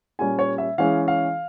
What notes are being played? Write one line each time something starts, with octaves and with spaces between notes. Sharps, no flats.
A#2 G3 C#4 G#5
C#5
E5
E3 G#3 C#4 F5
F5